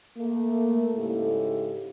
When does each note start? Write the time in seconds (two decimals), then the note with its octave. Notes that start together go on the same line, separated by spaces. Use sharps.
0.17 A3 A#3
0.94 G#2 C#3 E4 G4 A4